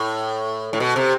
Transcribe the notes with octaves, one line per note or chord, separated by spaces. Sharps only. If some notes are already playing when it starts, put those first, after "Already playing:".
Already playing: A2
A2
B2
C3